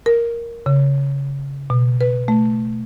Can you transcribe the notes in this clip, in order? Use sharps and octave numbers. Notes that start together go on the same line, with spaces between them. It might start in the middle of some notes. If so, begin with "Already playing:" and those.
A#4
C#3
B2
B4
A3